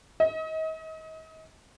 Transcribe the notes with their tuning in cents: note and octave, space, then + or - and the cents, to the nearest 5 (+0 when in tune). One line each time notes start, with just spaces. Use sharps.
D#5 +35